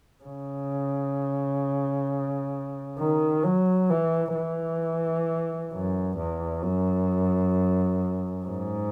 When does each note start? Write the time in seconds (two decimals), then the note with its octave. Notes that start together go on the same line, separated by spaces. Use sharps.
0.24 C#3
2.99 D#3
3.44 F#3
3.90 E3
4.35 E3
5.72 F#2
6.18 E2
6.63 F#2
8.46 G#2